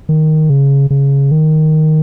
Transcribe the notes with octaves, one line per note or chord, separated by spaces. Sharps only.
D#3
C#3
C#3
D#3